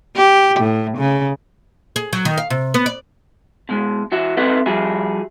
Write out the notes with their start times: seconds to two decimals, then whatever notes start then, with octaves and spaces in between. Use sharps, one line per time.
0.16 G4
0.59 A2
0.97 C#3
1.96 G#4
2.13 F#3
2.25 D#3
2.38 F5
2.50 C3
2.74 B3
2.86 D5
3.69 B2 G#3
4.12 E3 F#4 E5
4.37 C4 A4 B4 D#5 E5 F#5
4.66 F3 G3 F#4 G#4 E5